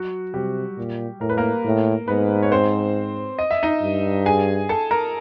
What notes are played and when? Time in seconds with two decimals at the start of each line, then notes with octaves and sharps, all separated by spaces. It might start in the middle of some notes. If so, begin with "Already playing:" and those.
Already playing: F#3 F#4
0.34 C3 G3 G4
0.77 A#2
1.21 A2 A#4
1.30 B4
1.37 A#3 A#4
1.64 A2
2.08 G#2 B3 B4
2.43 C#5
2.52 C4 C5
3.39 D#5
3.51 E5
3.63 D#4 D#5
3.82 G2
4.26 G#4 G#5
4.69 A4 A5
4.91 A#4 A#5